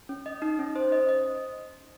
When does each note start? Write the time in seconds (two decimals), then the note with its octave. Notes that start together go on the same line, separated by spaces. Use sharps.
0.09 C#4
0.26 D#5
0.42 D#4
0.59 C#4
0.76 C5
0.92 D#5
1.09 D#5